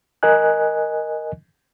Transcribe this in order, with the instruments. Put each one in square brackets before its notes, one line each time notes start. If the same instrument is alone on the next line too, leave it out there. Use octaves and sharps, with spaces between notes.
[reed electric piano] A#4 D#5 G#5 F#6